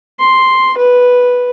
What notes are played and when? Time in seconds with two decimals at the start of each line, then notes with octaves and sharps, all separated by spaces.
0.19 C6
0.77 B4